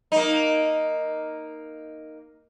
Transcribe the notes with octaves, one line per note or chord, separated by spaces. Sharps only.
A#3 D#4